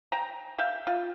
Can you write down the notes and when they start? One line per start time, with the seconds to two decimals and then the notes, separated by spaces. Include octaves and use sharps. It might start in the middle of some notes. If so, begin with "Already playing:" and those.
0.12 G5 A#5
0.58 E5 F5 G5
0.87 F4